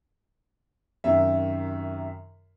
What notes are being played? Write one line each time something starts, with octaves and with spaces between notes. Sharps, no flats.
F#2 C3 D#3 E5